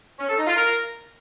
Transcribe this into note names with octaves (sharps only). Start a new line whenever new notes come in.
C#4
A4
D#4
F4
A#4